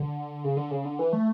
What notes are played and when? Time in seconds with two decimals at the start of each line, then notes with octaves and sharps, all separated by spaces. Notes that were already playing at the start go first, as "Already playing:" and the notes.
Already playing: D3
0.44 C#3
0.57 D3
0.71 C#3
0.85 D3
0.99 E3
1.13 A3